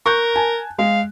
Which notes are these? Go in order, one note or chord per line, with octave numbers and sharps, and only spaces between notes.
A#4 C#6 F#6 G6
G#5 A5
G#3 F5